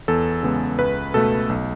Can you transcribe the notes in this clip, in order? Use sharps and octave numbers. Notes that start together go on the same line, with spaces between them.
E2 A4
C#3 G#3 B3
C#2 B4
B2 A3 A4
B1